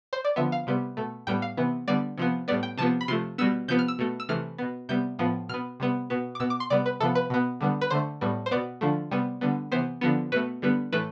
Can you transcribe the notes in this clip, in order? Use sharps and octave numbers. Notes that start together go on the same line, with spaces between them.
C5
D5
D3 F3 B3 E5
F5
C3 G3 B3
B2 A3
A2 G3 B3 G5
F5
C3 E3 B3
D3 G3 B3 D5
C3 F3 B3
A2 G3 B3 D5
G5
C3 F3 B3 A5
B5
C3 F3 A3 C6
B2 G3 B3 E6
C3 F3 B3 G6
F6
E6
B2 A3
E6
C3 E3 A3 F6
B2 B3
C3 G3 B3 G6
A2 F3 B3
B2 B3 F6
C3 G3 B3
B2 B3
D6
B2 B3 E6
D6
C6
C3 G3 B3 D5
B4
C3 F3 B3 A4
B4
B2 B3
D3 G3 B3
B4
D3 A3 C5
A2 G3 B3
C5
B2 B3 D5
D3 F3 A3
C3 G3 B3
D3 G3 B3
C3 E3 B3 C5
D3 F3 B3
B2 A3 B4
D3 G3 B3
A2 E3 A3 B4